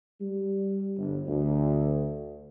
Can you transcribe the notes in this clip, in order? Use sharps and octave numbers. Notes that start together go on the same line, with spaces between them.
G3
G1
D2